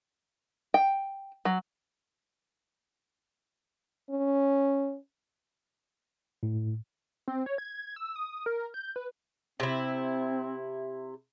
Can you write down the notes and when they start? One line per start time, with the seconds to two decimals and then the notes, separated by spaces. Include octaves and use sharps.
0.74 G5
1.45 F#3
4.11 C#4
6.43 A2
7.28 C4
7.46 C#5
7.58 G#6
7.96 E6
8.16 D#6
8.46 A#4
8.74 G6
8.96 B4
9.60 C3 C4 E4